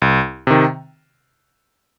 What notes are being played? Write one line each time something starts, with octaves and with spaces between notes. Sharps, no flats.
C2
C3 D#3